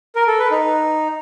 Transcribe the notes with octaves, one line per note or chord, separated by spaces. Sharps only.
A#4
A4
B4
D#4